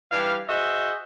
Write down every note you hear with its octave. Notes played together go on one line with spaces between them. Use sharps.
E3 G3 D4 F5
F#4 G#4 C5 D#5 E5